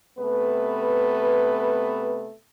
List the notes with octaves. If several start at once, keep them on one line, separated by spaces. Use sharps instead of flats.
C3 A3 B3 B4